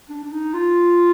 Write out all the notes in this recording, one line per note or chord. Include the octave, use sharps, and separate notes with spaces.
D4
D4
D#4
F4